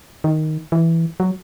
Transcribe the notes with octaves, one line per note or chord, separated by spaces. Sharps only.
D#3
E3
F#3